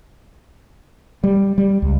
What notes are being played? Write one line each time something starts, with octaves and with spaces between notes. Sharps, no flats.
G3
G3
C#2